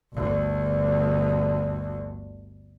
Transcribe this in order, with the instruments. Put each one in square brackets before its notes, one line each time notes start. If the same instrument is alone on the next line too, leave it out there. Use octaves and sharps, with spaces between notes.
[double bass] G1 D2